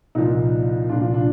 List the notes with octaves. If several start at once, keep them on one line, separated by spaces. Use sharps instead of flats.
C2 A#2 F3 D#4
C2 A#2 F3 D4 F4
D4 F4
D4 F4